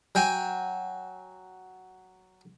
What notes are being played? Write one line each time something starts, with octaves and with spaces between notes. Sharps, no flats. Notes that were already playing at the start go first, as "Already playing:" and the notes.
F#3 G5 G#5